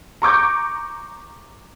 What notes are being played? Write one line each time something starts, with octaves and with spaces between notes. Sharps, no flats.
A#5 C#6 D6 G6